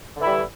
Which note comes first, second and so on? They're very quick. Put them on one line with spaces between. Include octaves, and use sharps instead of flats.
D3 E3 E4 G3